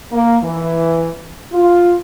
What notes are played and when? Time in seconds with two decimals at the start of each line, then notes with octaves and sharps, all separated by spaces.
0.12 A#3
0.43 E3
1.52 F4